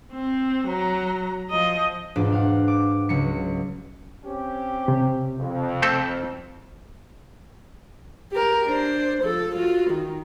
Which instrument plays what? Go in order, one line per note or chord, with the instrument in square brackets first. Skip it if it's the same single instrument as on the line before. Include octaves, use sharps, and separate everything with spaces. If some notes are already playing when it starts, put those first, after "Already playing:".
[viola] C4
F#3 A#5
F3 D#5
[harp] E1 G#2 D4 F4 D5
F5 F#5
D6
C#2 F#3 C#7
[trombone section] C4 C#4 G4
[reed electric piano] C3
[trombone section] F2
[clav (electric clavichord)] A3 C4 A4
[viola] G4 A#4
D4 C5
F3 A4
F4 F#4
D#3